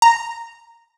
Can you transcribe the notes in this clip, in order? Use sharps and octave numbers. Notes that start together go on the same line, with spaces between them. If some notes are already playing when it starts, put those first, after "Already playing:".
A#5